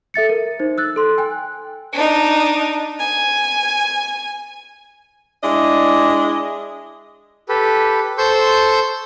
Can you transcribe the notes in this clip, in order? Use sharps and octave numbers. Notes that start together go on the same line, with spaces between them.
A4 E5 A6 C#7
A#4
D#4 C5
E6 F#6 A6
A4 C6
G5 G#5 F#6
D4 D#4
G#5
G#3 D4 E4 D#5
G4 A4 B4
A4 C5 C6 C#6 G6